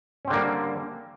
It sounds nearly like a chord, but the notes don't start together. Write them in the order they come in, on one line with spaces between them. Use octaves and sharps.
C#4 C4 D3 A#3 G3